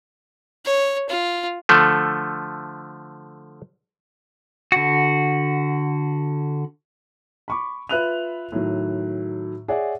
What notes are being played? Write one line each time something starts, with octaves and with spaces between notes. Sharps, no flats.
C#5
F4
D3 F3 A3
D3 F#4
B5 C#6 D6
F4 B4 E5 F#6 D#7 F7
A2 D#3 F#3
G#4 C#5 D5 E5 F#5